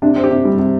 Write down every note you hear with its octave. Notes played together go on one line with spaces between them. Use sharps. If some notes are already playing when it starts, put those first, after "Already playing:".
C3 D4
C4
G4
C3
G3
C3